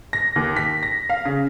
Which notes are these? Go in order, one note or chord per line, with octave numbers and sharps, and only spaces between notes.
A#6
D#2
B6
A#6
F5
C#3